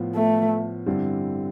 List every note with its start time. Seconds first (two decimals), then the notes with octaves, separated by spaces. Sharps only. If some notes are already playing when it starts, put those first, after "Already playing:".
Already playing: A2 F3 B3 F4
0.15 A3
0.86 G2 D3 G3 C4 E4